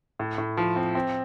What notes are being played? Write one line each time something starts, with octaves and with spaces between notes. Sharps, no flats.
A2
A2
F3
C4
C4